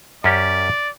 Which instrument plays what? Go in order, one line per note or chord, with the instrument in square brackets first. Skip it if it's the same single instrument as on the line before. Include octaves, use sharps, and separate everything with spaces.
[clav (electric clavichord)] F#2 C#4 G4 [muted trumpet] D5